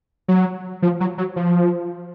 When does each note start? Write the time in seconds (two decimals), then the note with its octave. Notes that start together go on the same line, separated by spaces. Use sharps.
0.28 F#3
0.82 F3
1.00 F#3
1.18 F#3
1.36 F3